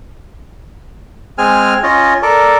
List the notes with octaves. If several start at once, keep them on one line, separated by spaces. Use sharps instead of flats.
G#3 C4 G#5 F6
C#4 F4 D#5
A4 A#4 D5